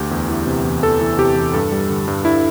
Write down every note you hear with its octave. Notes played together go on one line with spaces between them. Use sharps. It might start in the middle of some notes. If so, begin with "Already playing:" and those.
Already playing: D2 G4
E2
E3
C3
E2
E2 A4
E3
C3 G4
E2
G2 A4
G3
D3
G2
G2 E4